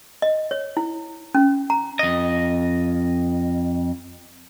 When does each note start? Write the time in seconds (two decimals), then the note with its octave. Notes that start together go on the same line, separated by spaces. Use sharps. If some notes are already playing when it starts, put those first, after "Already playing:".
0.22 D#5
0.51 C#5
0.77 E4
1.35 C#4
1.70 A#5
1.99 F2 D#5